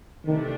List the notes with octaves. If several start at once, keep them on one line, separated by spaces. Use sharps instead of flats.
C3 D#3 E3 A3 D4